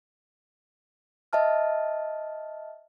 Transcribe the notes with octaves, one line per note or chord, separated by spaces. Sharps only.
D#5 E5 A5 F6